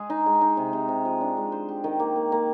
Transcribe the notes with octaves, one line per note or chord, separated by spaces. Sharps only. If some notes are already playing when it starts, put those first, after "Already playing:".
Already playing: G#3 G#4
D#4
G#3
D#4
C3
C3
C3
F3
D4
G#3
C5
G4
D#3
A#3
A#3
A#3